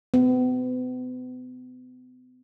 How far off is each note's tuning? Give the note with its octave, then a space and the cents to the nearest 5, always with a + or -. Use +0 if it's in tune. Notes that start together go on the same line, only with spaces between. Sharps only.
B3 +40